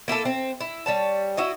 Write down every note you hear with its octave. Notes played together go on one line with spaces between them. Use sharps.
A#3 E4 G4 A4
C4
E4
G3 C#5 A5
E4 F#4 D#5